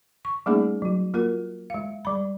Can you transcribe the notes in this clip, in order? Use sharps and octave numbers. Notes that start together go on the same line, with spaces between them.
C#6
G3 A3 A#3 C#4 D#4 G#4
F#3 F#4
A#3 F4 F#4 A#4
G#3 F5
G3 B5